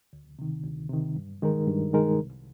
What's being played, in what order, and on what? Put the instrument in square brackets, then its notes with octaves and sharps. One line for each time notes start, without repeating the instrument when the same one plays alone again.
[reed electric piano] D2
C3 D#3
D2
C3 D#3
G2
D#3 G#3 D#4 A#4
G2
D#3 G#3 D#4 A#4
C2